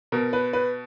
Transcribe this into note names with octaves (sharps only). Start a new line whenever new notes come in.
B2 A#4
B4
B4